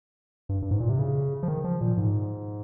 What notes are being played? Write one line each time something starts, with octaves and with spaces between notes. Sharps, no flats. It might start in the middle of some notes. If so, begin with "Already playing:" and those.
G2
G2
G#2
A#2
C3
C#3
F3
D#3
F3
A#2
G#2